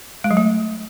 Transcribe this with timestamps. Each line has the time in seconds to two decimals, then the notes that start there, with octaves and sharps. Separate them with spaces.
0.24 G#3
0.31 F#3
0.37 A3